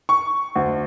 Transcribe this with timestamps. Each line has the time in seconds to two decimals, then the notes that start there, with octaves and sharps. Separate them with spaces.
0.09 C#6
0.56 D2